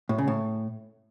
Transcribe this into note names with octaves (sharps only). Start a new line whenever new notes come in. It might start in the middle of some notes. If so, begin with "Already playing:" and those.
A2
C#3
A2